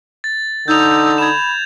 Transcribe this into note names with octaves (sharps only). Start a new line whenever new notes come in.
A6
D3 D#4 E6 G6 F7
B5 G#6 E7